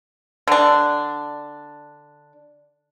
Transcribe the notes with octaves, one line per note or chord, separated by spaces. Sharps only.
D3 D4